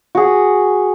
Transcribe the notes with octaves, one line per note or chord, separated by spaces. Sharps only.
F#4 G#4